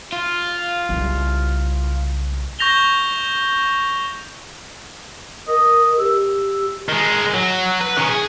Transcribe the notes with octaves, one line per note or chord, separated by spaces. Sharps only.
F4
C2 C#3
C#6 G6 A#6 F7 G7
A#4 D#5
G4 E6
D#3 G#3
F#3
B4
D#3 C#4
G#4